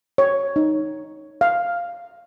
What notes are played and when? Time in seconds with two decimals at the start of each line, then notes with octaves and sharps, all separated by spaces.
0.18 C#5
0.56 D#4
1.41 F5